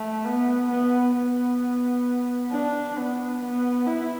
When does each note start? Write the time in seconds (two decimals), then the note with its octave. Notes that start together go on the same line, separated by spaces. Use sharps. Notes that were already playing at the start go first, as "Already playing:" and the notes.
Already playing: A3
0.25 B3
0.70 B3
1.16 B3
2.51 D4
2.97 B3
3.41 B3
3.87 E4